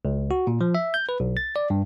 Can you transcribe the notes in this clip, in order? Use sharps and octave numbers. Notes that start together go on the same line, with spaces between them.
C#2
F#4
A#2
F3
E5
G6
B4
B1
A6
D5
G2